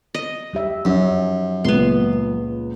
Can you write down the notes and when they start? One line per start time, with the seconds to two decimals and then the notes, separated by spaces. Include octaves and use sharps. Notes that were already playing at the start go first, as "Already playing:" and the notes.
0.14 D#5
0.53 G3 G4 E5
0.85 F#2 F3 C#4 D#4
1.64 C#2 A#2 B3 C6